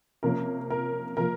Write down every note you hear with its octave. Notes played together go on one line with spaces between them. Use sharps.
C3 F3 A#3 C#4 A#4
A#4
C3 F3 A#3 A#4